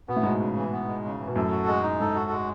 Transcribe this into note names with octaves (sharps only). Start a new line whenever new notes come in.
B2 B3
A2
G#2 B2 G#3
C#3
E3
B3
G#3
C#3
E3
B2
F#2 A2 A4
F#4
G#3
D#4
G#2 A4
F#4
G#3